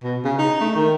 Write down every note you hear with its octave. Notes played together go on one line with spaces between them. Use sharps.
B2
C#3
D#4
A3
D#3